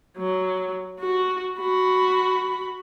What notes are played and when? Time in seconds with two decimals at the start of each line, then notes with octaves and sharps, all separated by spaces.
0.18 F#3
1.01 F#4
1.59 F#4 B5